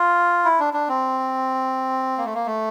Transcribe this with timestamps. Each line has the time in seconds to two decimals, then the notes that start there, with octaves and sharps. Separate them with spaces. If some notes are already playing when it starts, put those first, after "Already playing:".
Already playing: F4
0.45 E4
0.60 D4
0.73 D4
0.89 C4
2.18 A#3
2.26 A3
2.34 A#3
2.46 A3